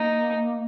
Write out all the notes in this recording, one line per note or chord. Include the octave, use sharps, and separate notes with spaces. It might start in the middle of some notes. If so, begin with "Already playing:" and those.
Already playing: A#3 D#4